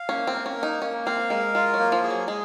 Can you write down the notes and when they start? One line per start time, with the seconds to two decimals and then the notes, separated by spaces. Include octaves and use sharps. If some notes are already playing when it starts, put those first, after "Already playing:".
Already playing: F5
0.09 A#3 C#4
0.27 C4
0.34 A#4
0.46 C#4
0.57 A#3
0.63 D#4
0.82 A#3 C#4
1.06 C4 F5
1.30 G#3 A#4
1.55 G#3 F4
1.74 F#3
1.79 A#3
1.92 F3
2.03 G#4
2.10 F#3
2.28 G#3 G#4